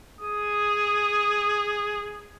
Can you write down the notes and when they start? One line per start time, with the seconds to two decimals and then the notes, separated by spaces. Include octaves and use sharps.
0.21 G#4 D#6